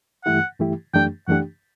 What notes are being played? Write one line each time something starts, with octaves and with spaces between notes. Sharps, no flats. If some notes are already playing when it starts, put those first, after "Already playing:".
G2 E3 A3 E4 G4 F#5
G2 E3 A3 E4 G4
F#2 E3 A3 D4 G4 G5
F#2 E3 A3 D4 G4 F#5